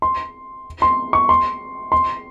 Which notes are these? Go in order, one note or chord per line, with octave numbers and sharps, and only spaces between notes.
C6
C6
C#6
C6
C6